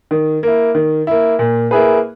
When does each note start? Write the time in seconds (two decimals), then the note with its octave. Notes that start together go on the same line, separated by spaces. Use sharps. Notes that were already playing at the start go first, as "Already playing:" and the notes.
0.11 D#3
0.43 A#3 E4
0.75 D#3
1.07 A#3 E4
1.39 A#2
1.71 A#3 E4 G#4 B4